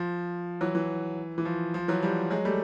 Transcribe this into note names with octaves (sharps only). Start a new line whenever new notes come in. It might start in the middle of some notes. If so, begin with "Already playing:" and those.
Already playing: F3
E3 F#3
E3
E3
F3
F3
E3 F#3
F3 G3
F#3 G#3
G3 A3